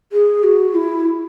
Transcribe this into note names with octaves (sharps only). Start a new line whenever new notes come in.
G#4
F#4
E4